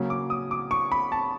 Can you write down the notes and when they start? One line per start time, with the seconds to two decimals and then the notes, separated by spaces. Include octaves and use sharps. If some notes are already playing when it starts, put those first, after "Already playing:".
Already playing: C#3 F#3 A#3 C#4
0.10 D6
0.30 D#6
0.51 D6
0.71 C#6
0.92 B5
1.12 A5